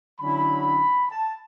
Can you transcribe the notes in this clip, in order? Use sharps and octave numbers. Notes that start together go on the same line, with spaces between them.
D3 F#3 C#4 E4 B5
A5